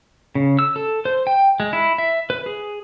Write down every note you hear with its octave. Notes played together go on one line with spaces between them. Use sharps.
C#3
E6
A4
C5
G5
G#3
E4
E5
B4
G#4